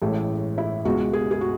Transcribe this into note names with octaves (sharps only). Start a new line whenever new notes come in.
A1 A2 G#3 A4
E4
C#2 B2 G#3 F#4
G#4
G#4
F#4